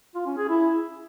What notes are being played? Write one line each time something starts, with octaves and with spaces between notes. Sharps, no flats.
F4
C#4
G#4
E4